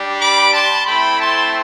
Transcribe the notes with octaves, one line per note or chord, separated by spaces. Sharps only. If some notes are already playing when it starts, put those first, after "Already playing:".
Already playing: G3 D4 G4
B5 D6
A5 C6
A3 C4 E4 G5 B5
A5 C6